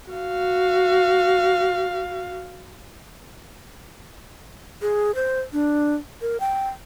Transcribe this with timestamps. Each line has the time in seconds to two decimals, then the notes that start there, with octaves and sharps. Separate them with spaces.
0.10 F#4 F5
4.82 G#4
5.15 C5
5.53 D4
6.22 A#4
6.40 G5